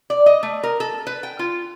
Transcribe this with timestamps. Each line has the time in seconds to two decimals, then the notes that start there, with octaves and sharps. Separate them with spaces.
0.10 D5
0.26 D#5
0.43 A3
0.63 A#4
0.80 A4
1.07 B4
1.23 G5
1.39 F4